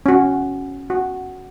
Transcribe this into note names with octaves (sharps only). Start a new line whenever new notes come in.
C#4 F#4
F#4